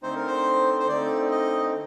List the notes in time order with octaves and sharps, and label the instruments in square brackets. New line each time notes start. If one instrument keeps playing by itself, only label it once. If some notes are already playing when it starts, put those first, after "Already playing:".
[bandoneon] D3 A3 C4 D#4 [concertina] C5
[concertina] A#4
C5
C5
[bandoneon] D3 A3 C4 D#4 [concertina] D5
[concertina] D#5